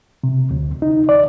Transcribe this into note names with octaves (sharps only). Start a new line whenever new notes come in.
C3
D2
D#4
D5